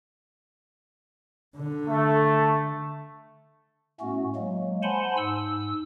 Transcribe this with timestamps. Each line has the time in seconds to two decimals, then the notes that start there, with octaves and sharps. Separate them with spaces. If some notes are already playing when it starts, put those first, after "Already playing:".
1.57 D3
1.87 A3
4.01 A2 A3 B3 C#4 F#4
4.36 F#3 G#3 A#3
4.83 C5 F#5 G#5 A5 B5 C6
5.17 G#2 E6